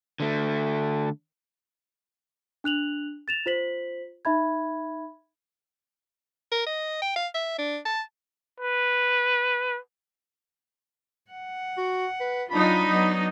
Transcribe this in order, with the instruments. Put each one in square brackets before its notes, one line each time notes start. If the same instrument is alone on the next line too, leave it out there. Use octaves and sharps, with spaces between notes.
[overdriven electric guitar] D3 A3
[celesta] D4 F#6 F7 F#7
A6 E7 F7
F4 C5 B6 F#7
D#4 E5 B5 G#6
[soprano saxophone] A#4
D#5
G5
F5
E5
D4
A5
[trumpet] B4
[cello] F#5
[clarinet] F#4
B4
[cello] F#3 F4 [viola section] D4 D#4 [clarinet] B5
[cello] F#3 B3